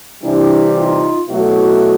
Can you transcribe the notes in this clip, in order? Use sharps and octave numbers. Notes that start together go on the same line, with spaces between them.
C3 E3 G3 D4 E4
D#4 F4
B2 F#3 A3 E4 F#4